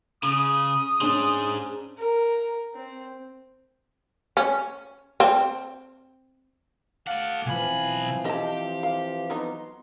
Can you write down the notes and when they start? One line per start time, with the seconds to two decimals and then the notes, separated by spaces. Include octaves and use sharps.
0.23 C#3 D#6
1.01 C#4 D4 G#4 C5
1.98 A#4
2.74 C4
4.37 C#4
5.20 C4
7.07 A3 F5 F#5 A5 D6
7.46 B1 E3 F3 C4 G#5 B5
8.25 G4 D#5 A5 C6
8.83 F5
9.30 F#3 B3 D#4